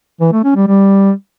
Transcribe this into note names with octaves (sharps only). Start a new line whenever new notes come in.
E3
A3
C#4
G3
G3